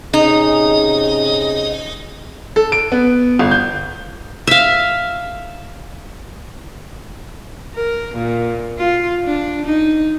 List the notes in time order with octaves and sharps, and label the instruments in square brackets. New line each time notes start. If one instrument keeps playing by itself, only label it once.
[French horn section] C3 C#4 G#4 [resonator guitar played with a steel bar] D#4 [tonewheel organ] D#5
[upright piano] A4
D7
B3
G1
G6
[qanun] E5 F5
[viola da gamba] A#4
A#2
F4
D4
D#4